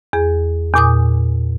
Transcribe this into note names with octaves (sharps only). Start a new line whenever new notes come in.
E2 G#4
E2 A#2 G#5 D6 D#6